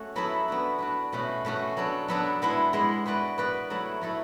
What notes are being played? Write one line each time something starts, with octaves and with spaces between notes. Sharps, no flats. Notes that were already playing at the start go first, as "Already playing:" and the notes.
Already playing: A3 C#4 F#4
F#3 B3 E4 A4 E5
B3 D4 F#4
B3 D4 F#4
B2 A3 C#4 F#4
B2 A3 C#4 F#4
F#3 B3 D4 A4
F#3 B3 D4 A4
G#3 B3 E4
G#3 B3 E4
B3 F#4 B4 D5
B3 F#4 B4 D5
F#3 A3 E4 A4
F#3 A3 E4 A4